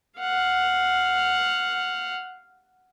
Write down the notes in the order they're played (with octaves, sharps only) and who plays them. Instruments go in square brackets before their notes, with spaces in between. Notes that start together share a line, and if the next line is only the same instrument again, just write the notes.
[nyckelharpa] F5 F#5